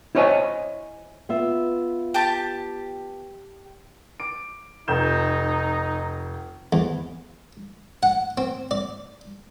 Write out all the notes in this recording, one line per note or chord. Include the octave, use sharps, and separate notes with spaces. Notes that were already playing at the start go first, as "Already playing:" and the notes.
E4 C5 C#5 D#5 G#5
B3 F4 E5
G4 A5
D6 D7
F1 D#4 G6 E7
E2
F#5
C4
D5